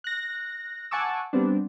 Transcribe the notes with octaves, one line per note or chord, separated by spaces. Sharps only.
F#6 A#6
F#5 G#5 A5 C#6 D6 E6
G3 B3 C4 D4